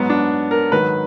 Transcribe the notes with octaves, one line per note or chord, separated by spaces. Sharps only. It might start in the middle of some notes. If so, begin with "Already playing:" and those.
Already playing: G#2 F#3 B3
D4
A#4
G#2 D#3 F#3 B4